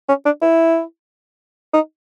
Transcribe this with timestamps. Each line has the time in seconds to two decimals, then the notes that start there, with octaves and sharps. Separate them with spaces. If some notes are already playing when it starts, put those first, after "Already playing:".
0.08 C#4
0.25 D4
0.42 E4
1.73 D#4